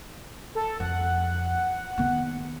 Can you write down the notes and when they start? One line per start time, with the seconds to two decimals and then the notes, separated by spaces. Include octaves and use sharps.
0.55 A4
0.80 F2 F#5
1.98 D#3 B3